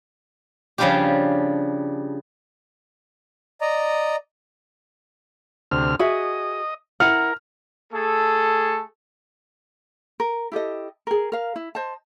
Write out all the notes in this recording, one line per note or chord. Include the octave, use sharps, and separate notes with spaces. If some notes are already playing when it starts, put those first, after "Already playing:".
C#3 F3 G3 D4 F4 G4
D5 D#5 A#5
D2 C3 F6
F#4 G#4 D#5 E5
E4 A#4 F#5 F6
A3 G#4 A4
A#4
E4 G4 A4 D#5
G#4 A#4
A#4 F5
E4
C5 D#5 A5